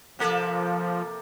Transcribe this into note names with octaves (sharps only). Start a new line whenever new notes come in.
C3 F3 A#3 A4